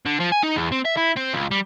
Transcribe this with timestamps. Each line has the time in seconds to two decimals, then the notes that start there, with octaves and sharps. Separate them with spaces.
0.06 D3
0.20 F3
0.32 G#5
0.43 D#4
0.56 E2
0.72 C4
0.85 E5
0.97 E4
1.16 C4
1.33 C#2
1.51 G3